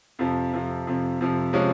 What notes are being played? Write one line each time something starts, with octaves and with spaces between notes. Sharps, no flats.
F2 C3 F3
F2 C3 F3
F2 C3 F3
F2 C3 F3
C3 F3 G#3 C#4